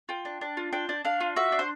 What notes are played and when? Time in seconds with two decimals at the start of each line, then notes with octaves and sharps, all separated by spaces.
0.09 F4 G5
0.25 D4
0.41 D4
0.57 F4
0.73 D4 G5
0.89 D4
1.05 D4 F5
1.20 F4
1.36 F#4 E5
1.52 D4
1.59 C5